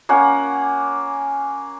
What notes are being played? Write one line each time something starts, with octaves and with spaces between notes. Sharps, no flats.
A#3 C#4 F#5